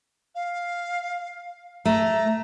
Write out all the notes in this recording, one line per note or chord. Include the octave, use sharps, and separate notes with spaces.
F5
A3 A#5